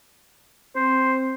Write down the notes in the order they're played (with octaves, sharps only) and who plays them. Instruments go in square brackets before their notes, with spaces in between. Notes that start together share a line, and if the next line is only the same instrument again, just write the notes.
[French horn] C4 [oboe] C5